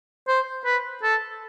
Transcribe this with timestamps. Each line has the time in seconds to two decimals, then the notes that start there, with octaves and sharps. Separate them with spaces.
0.28 C5
0.65 B4
1.03 A4